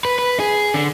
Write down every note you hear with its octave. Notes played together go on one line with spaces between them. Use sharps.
B4
B4
G#4
D3